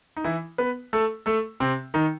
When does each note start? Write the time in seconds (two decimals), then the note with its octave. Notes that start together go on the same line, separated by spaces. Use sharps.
0.17 D#4
0.24 E3 E4
0.58 B3 B4
0.93 A3 A4
1.26 A3 A4
1.60 C3 C4
1.94 D#3 D#4